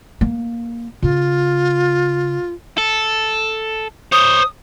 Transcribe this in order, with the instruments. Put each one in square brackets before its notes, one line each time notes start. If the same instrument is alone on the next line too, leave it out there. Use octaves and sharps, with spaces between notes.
[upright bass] A#3
[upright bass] C#3 [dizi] F4
[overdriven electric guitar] A4
[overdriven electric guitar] C5 C#5 [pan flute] D#6